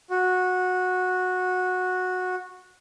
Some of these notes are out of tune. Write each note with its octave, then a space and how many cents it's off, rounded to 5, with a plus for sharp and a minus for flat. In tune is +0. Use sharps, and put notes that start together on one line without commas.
F#4 -15